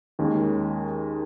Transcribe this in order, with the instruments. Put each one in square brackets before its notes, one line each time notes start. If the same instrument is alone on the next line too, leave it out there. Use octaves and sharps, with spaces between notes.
[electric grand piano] D#2 D#3 G#3 C#4